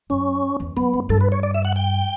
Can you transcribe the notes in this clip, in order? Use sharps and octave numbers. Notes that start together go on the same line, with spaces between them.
F#2 C#4
E2
F#2 B3
G2
G2 A4
B4
C#5
D5
E5
F#5
G5